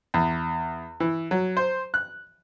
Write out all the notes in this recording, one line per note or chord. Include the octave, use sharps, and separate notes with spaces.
E2
E3
F#3
C5
F#6